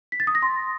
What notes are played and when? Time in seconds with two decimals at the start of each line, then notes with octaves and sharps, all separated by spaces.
0.12 B6
0.20 A6
0.27 D#6
0.35 A#6
0.42 C6